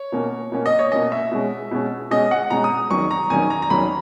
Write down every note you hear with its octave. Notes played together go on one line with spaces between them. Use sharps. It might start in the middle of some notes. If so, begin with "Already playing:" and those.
Already playing: C#5
B2 A#3 C#4
B2 A#3 C#4
D#5
C#5
B2 A#3 C#4 D#5
E5
B2 G#3 C#4
B2 G#3 C#4
B2 G#3 C#4 D#5
F#5
B2 G#3 C#4 A#5
D#6
E2 D#3 F#3 C#4 C#6
A#5
E2 D#3 F#3 C#4 G#5
A#5
A#5
E2 D#3 F#3 C#4 B5